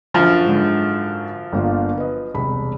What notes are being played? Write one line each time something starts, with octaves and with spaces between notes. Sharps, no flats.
F#2 D3 F3
G#2 D3
G1 A#3 F4
B4 D#5
E1 C2 B5